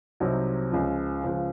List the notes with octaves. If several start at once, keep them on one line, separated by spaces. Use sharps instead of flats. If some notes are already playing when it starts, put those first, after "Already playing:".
C2 C3 F#3 C4 D#4
C#2 C#3 F3
C#2 C#3 F3